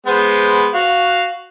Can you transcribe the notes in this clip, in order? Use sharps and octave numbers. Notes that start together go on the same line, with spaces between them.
G#3 B3 C5
F#4 F5